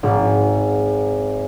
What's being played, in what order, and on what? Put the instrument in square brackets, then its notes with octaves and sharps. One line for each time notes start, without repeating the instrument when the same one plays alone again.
[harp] G#1